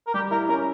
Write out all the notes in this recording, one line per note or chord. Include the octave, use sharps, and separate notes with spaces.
A#4
G3 G4
E4 A#4
C#4 A#4